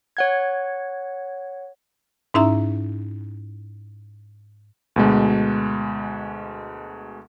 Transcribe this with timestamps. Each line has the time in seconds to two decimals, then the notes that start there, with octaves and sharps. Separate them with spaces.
0.17 C#5 F#5 G#6
2.34 G#2 C#4 D#4 E4 E5 A#5
4.96 D2 B2 G#3